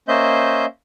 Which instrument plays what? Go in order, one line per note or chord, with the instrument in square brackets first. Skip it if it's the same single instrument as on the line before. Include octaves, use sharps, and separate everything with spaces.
[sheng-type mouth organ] A#3 C#4 C5 D#5 E5 G6